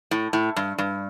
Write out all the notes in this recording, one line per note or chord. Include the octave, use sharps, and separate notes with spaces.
A2
A2
G2
G2